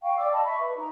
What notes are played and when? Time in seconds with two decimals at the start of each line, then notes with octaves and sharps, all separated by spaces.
0.02 F5 G5 C#6
0.17 D5 D6 E6
0.32 D#5 A5 B5
0.44 E5 B5 C#6
0.61 B4
0.78 D#4 A#5